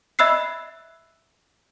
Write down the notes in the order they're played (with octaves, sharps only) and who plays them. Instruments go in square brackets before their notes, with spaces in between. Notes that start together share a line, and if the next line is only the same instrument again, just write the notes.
[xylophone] D#5 E5 B5 E6 F#6 C7